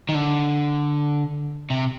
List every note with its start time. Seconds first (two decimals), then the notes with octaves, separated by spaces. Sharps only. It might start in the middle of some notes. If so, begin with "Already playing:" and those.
0.09 D#3
0.15 D3
1.70 C3